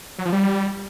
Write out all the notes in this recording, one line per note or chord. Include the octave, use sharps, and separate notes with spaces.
F#3
F3
G3